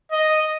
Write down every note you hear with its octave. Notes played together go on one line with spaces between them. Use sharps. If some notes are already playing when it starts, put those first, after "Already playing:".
D#5